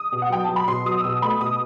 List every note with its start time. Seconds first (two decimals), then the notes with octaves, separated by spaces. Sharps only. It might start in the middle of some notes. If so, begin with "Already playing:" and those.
Already playing: D#6
0.12 B2
0.22 F#5
0.30 F#3 G5
0.44 F#3 A5
0.56 B5
0.68 B2 C6
0.86 F#3 D#6
1.01 E6
1.04 B2 D#6
1.22 A3 B5
1.41 B2 D#6